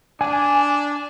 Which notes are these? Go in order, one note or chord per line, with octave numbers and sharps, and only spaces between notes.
D4 G#5